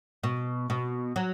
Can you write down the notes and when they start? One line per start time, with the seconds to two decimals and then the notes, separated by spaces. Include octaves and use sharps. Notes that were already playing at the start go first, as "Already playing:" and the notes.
0.23 B2
0.70 B2
1.16 F#3